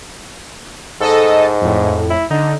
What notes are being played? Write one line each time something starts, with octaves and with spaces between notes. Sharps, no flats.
G#2 A4 D#5
F2 A2
E4
D3 D#4